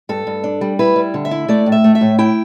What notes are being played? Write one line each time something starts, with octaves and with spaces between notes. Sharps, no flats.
G2 A4
G2
D4
G3
E4 B4
G3
D3
E5
E4
A3 D5
A2
E5
A3
E5
A2
E4 G5